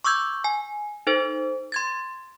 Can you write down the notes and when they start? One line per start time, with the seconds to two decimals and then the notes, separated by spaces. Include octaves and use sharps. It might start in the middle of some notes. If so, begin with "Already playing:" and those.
0.04 C#6 D6 E6 G6 G#6
0.44 G#5
1.07 D#4 A4 C5
1.72 C6 G#6 A6